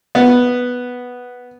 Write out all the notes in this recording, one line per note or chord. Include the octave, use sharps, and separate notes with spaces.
B3